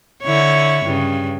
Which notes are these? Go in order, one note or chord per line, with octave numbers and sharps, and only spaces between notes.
D3 E4 C#5
G2 C#3